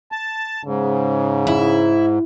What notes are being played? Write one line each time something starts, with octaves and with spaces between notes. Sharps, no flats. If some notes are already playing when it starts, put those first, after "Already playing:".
A5
G#2 C#3
E4